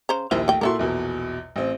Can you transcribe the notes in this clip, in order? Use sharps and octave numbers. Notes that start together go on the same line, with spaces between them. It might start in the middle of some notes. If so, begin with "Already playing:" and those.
C#3 C5 A#5
A#1 D#2 E4 A#4 C5
A3 G5
A#2 E4 F#4 A4 A#4 C6
A#1 E2 B2
A1 C4